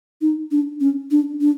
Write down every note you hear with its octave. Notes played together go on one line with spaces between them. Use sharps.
D#4
D4
C#4
D4
D4